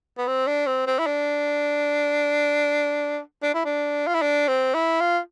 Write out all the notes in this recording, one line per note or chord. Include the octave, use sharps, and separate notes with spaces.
B3
C4
D4
C4
C4
E4
D4
D4
E4
D4
F4
E4
D4
C4
E4
F4